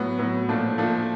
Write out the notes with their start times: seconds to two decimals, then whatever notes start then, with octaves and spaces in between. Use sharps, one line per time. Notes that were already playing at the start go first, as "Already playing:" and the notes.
Already playing: A2 F#3 B3
0.19 A2 F#3 B3
0.49 A#2 F3 A3 D4
0.78 A#2 F3 A3 D4